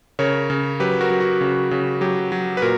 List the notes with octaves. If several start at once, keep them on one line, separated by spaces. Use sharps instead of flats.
C#3 A#4 C#5
C#3
F#3 G4 B4
F#4 A#4
F#3
F#4
C#3
C#3
F#3 G4
F#3
B4
A#2 F#4 A#4